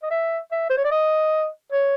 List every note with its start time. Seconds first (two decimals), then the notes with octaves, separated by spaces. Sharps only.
0.03 D#5
0.11 E5
0.52 E5
0.70 C5
0.77 C#5
0.85 D5
0.91 D#5
1.72 C#5